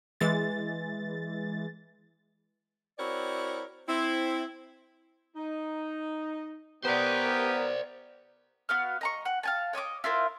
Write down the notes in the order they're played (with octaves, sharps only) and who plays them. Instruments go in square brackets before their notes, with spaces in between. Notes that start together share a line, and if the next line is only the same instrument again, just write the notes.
[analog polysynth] E3 G#3 A6
[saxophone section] C4 E4 F#4 A#4 C#5 D5
C4 E4
[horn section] D#4
[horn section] B3 A#4 [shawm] G4 [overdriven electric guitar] C5 D5
[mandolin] B3 F#4 F5 F6
D#5 A#5 C#6
F#5
F5 G#5 A5
C#5 D#5 C#6 D6
E4 F4 A#4 C5